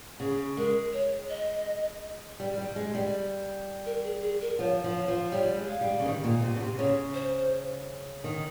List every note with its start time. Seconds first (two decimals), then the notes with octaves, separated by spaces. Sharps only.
0.20 C#3 G#4
0.57 G#3 A#4
0.93 C#5
1.29 D#5
2.40 G3
2.58 G3
2.76 G#3
2.95 G3
3.86 A#4
4.04 G#4
4.22 G#4
4.41 A#4
4.59 F3 C#5
4.84 F3
4.96 C#5
5.08 F3
5.32 G3 C#5
5.56 G#3
5.69 F5
5.81 G3
5.99 C#3
6.06 D#3
6.24 A#2
6.42 C3
6.56 C#3
6.60 C3
6.78 C#3 C#5
7.14 C5
8.24 D#3